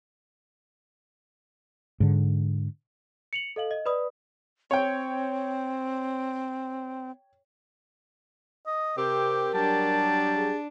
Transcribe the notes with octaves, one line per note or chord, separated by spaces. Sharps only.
G#2 D3
C#7 F7 F#7
A4 D#5 F5 F#7
D#5
B4 D5 B5 D#6
C4 C#5 G5
D#5
C3 C4 G4 A#4 D6
F#3 G3 D4 G4 A5
G#4